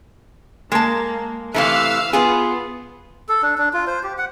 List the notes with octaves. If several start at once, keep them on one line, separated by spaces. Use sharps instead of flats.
G#3 A#3 A5
C3 E3 A3 F5 E6 F#6
B3 F4 G#4
A4
D4
D4
F4
C5
G4
F#5